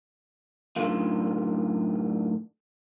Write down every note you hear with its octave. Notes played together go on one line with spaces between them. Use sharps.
F#2 A2 D3 D#3 F4